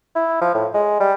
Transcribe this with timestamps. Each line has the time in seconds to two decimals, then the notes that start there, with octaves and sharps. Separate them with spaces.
0.15 E4
0.41 F3
0.54 A2
0.74 G#3
1.00 G3